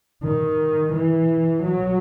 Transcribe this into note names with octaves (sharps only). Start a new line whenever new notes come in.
D#3
E3
F#3